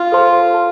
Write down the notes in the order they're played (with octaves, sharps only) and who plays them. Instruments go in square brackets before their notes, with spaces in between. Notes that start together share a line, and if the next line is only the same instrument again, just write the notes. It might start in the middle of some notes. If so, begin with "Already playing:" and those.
Already playing: [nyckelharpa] F4
[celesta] A4 C5 A5 C6
A4 C5 A5 C6